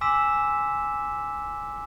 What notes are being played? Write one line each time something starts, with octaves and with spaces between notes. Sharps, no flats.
G#5 C6 D6 E6 B6 E7